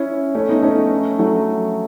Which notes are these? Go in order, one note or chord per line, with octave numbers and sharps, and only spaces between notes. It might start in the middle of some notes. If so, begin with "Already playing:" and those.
Already playing: C#4 E4
A3 C#4
B3 D#4
A3 C#4
F#3 A3